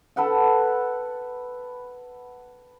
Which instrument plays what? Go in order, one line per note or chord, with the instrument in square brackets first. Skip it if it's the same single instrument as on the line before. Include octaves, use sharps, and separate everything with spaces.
[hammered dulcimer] A4 B4 F#5 G5